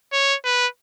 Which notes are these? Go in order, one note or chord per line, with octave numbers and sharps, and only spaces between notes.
C#5
B4